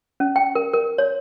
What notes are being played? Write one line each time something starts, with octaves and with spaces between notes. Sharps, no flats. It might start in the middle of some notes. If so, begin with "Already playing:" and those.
C#4
G5
A#4
A#4
C#5